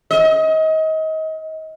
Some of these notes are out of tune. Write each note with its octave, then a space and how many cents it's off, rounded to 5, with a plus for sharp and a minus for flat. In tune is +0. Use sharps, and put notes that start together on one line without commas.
D#5 +30